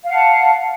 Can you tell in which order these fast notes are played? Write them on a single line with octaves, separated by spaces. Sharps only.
F5 F#5 A5